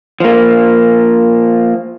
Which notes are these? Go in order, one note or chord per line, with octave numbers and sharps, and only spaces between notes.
F3 A#3